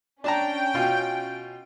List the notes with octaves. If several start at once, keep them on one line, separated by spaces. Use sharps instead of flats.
C#4 D4 G5 A5 A#5
B2 F4